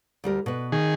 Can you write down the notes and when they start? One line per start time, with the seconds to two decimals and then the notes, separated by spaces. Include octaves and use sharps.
0.24 D2 G3 A#4
0.46 B2 B4
0.72 D#3 G#4